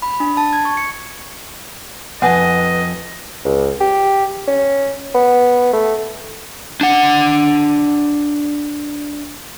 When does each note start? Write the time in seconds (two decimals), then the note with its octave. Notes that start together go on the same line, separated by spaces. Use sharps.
0.02 B5
0.20 D4
0.37 A5
0.53 G#6
0.65 C#6
0.77 C#7
2.22 F2 B4 D#5 F#5 G#5
3.45 C#2
3.81 G4
4.47 C#4
5.15 B3
5.73 A3
6.81 D4 F#5